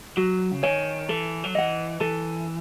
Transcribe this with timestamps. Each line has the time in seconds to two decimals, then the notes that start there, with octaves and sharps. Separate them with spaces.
0.17 F#3 F#4
0.52 C#3
0.63 D#3 C#5 G#5
1.09 E3 A4
1.44 F#3
1.55 E3 D#5 F#5
2.00 E3 A4